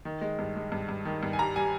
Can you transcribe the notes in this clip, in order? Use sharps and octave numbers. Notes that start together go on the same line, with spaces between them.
D#3
G#3
G2
G#3
G2
G2
D#3
G2
G#5
G3 A#5
G3 G#5